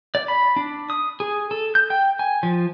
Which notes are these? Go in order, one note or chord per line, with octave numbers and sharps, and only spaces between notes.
D5
B5
D4
D#6
G#4
A4
G6
G5
G#5
F3